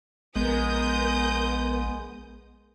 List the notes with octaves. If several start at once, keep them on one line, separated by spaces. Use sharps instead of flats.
A#1 G#3 B3 A#4 D#6 G6